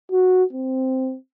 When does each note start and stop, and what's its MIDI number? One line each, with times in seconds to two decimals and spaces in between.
0.12 0.44 66
0.53 1.16 60